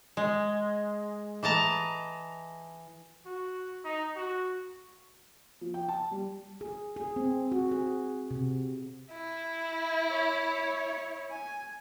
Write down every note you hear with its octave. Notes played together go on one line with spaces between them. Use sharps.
G#3
E3 D#5 A5 A#5
F#4
D#4
F#4
F3
G5
A5
G3
G#4
G#4
C4
F#4
G#4
C3
E4
C#5
G#5